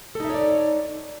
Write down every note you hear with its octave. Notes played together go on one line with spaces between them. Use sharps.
D#4 A4 C#5 D5 E5